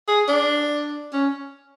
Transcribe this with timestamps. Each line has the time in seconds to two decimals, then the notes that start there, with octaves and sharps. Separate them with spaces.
0.08 G#4
0.28 D4
1.13 C#4